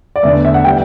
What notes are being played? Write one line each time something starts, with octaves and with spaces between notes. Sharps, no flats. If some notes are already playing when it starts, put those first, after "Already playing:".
D5
E2 D3 A3 E5
E5
F#5
E3 G3 B3 G5